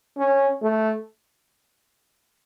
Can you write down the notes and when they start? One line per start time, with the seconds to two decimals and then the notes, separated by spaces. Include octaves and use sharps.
0.17 C#4
0.62 A3